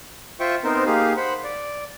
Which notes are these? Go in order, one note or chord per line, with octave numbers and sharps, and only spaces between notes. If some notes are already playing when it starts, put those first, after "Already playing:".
F4 C5 E5 G5 C#6
B3 C4 D#4 A#4 C5
A#3 D#4 G4 G#4 F5
C5 F#5 B5
D5